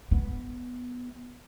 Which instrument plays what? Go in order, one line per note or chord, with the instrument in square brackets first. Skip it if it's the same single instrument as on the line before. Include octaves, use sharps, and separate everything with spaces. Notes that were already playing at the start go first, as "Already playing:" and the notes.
[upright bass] B3